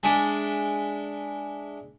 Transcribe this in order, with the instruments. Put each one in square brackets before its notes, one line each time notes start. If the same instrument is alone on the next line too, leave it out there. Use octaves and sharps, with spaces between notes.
[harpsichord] G#3 D4 E4